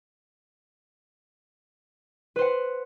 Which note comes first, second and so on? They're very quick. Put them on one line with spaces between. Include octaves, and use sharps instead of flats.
B4 C5 F#5